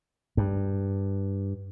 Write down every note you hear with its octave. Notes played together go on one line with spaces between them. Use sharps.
G2